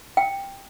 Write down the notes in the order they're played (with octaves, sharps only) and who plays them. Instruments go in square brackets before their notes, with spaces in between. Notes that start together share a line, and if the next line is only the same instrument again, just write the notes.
[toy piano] G5